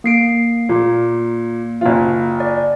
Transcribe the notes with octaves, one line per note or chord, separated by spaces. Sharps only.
A#3 C7 D7
A#2
F#1 F4
D5